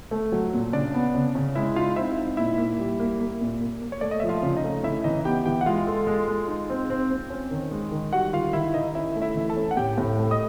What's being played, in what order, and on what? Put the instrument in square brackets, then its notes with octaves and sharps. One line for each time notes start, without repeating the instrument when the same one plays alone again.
[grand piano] A3
F#3
A#2
[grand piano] C#3 [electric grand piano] D4 D5
[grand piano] B3
C#3
C#3
[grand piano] G#3 [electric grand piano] E4 E5
[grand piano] D#4 [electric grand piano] F4 F5
[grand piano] C4 [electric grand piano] E4 E5
[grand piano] D#4
[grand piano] A#2 [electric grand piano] E4 E5
[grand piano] A#3
G3
A#3
A#3
A#2
A#3
A#3
[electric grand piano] C#5
[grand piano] A3 [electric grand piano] D5
[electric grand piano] D#5
[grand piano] F3 [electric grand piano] E5
[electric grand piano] F4 F5
[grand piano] C#3
[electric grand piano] D#4 D#5
[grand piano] A3
[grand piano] C#3 [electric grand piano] E4 E5
[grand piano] E3 [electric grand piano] D#4 D#5
[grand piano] B3 [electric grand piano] G4 G5
[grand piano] E3 [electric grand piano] G4 G5
[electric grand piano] F#5
[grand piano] G#3 [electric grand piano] F4 F5
[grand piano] A4
G#3
G#3
D#4
C4
C4
C4
C#4
D#3
G#3
D#3
[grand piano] G3 [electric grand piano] F#4 F#5
[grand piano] D#3 [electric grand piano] F4 F5
[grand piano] D#3 [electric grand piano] E4 E5
[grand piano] D#3 [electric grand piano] D#4 D#5
[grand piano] C#4 [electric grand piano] E4 E5
[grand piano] A3
[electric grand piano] E4 E5
[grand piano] E3
[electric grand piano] A4 A5
[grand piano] C#4
[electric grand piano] F#5
[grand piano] A2 [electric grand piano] G4 G5
[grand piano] A2
A3
[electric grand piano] D#5 D#6